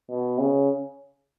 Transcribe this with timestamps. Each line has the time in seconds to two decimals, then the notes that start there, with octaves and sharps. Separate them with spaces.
0.10 B2
0.39 C#3